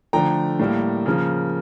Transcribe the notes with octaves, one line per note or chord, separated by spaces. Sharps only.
D3 F3 A3 G5 A#5
A2 G3 A#3
C#3 F3 A#3